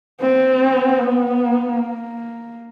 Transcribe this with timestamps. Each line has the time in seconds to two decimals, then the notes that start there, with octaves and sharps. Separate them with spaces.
0.21 C4
0.99 B3
1.76 A#3